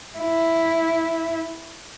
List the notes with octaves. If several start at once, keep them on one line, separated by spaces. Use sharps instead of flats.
E4